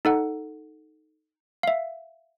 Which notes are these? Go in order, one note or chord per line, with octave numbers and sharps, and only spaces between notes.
D#4 A4 F#5
E5 F5